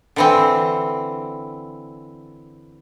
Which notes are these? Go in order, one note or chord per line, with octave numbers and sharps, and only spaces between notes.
D3 E3 C4